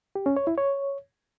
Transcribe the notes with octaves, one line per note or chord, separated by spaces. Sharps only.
G4
C#4
C#5
E4
C#5